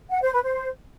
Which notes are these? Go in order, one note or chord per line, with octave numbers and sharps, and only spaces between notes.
F#5
C5
B4
C5